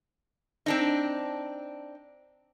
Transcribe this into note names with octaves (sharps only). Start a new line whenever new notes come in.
C4 D4 D#4